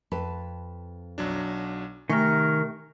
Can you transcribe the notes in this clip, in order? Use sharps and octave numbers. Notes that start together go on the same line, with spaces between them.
F2 B4 A5
B1 F#3 D4
C3 D#3 A3 A#4 G#5 C#6